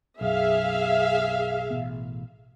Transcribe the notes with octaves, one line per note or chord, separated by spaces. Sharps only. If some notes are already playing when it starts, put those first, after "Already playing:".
B1 F#2 G#4 E5 F5
A1 B2 B3